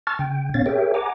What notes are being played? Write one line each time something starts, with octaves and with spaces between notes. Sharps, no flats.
A5 C#6 F6 A6
C#3 G5
A#2 B3 C#4 C#5 F5 A6
G4 G#4 A#4 C#5 E5 G5
F#5 G#5 A#5 D6